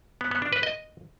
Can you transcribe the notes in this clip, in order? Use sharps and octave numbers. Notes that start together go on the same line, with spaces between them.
B3
B3
D4
B4
D#5